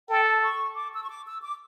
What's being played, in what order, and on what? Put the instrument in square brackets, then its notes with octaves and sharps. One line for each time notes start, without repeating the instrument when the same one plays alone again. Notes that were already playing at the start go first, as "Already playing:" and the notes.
[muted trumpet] A4 [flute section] G5
[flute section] A5
C#6
D6
E6
C#6
D6
E6
D6